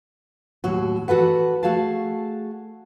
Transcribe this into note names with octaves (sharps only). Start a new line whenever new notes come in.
D#2 A2 F#3 F#4
E3 F#4 A4 B4 F#5
A3 F#4 G#4 F5 A5